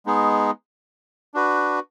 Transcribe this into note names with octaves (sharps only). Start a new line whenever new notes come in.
G#3 B3 D#4 G#4
D4 F#4 B4